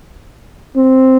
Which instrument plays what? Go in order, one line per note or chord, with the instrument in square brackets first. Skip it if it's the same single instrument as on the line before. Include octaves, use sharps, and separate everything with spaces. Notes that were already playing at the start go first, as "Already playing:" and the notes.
[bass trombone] C4